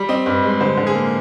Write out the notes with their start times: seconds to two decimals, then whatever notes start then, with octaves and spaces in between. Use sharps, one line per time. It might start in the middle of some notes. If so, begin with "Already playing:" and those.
Already playing: G3
0.09 C4 D#5
0.26 G2
0.43 G#3
0.61 D3 C5
0.77 D3
0.87 G#4
0.95 A#3